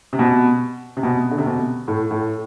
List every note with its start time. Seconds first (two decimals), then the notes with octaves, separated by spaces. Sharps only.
0.13 C3
0.19 B2
0.97 C3
1.03 B2
1.31 D3
1.38 C3
1.46 B2
1.88 A2
2.11 A2